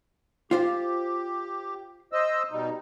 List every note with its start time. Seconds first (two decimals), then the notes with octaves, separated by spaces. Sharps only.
0.51 F4 G4 C5 F5
2.13 C5 D#5 E6
2.52 B2 G3 D#4